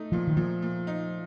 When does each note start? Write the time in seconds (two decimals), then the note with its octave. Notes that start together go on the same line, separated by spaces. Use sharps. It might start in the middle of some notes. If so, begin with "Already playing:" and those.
Already playing: A3 D#4
0.12 A#2 F3
0.27 D#3
0.37 A#2 F3
0.62 A#2
0.87 D#4